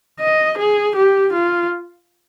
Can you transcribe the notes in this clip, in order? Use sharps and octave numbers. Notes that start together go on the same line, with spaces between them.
D#5
G#4
G4
F4